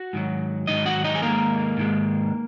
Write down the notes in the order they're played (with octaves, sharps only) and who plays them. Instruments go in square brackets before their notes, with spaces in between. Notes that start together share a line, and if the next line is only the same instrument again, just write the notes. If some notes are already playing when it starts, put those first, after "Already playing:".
Already playing: [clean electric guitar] F#4 F#5
G#2 D#3 F#3
G#2 D#3 F#3 D#4 D#5
F#4 F#5
D#4 D#5
G#4
G#2 D#3 G#3 A#3 A#4
G#2 D#3 G#3